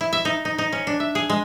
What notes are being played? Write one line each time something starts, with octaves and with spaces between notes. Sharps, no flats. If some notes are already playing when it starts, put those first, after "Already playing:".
E4
E5
D#4
D#4
D#4
C#4
D4
E5
G#4
G#3